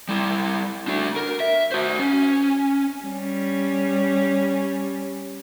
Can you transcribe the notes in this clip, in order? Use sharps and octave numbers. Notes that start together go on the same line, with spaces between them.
G3 E4
D4 F#4
A#4
E5
F#4 C5
C#4
G3 C#4